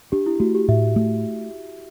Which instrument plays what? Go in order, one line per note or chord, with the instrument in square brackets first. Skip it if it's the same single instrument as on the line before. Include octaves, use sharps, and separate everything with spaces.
[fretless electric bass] D4 [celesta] G4
[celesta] E4
[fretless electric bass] A3 [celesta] F#4
[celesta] G4
[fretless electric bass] A2 [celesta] E5
[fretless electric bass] A3